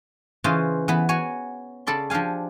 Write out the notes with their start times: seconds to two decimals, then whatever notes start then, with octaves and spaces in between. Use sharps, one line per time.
0.44 C#3 E3 C#4 F4 C5 D#5
0.88 E3 B3
1.09 F#4 C#5 G#5
1.87 C#3 A4 D5 B5 C6
2.10 F3 D4 G4 F5 G#5